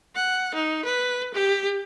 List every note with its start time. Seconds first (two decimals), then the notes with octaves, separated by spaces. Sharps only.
0.15 F#5
0.54 D#4
0.85 B4
1.34 G4